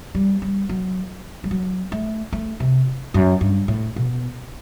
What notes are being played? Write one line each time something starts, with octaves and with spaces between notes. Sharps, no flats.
G3
G3
F#3
G3
F#3
A3
A3
C3
F#2
G2
A2
B2